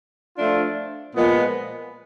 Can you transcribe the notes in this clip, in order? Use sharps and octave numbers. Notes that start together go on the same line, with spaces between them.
F3 A3 D4 F4
A#2 F3 G#3 B3